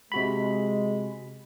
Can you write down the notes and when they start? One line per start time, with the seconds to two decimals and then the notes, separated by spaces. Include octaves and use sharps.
0.12 C3 G#3 F#4 B5